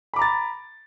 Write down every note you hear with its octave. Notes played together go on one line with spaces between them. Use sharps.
A#5 B5 D6 A6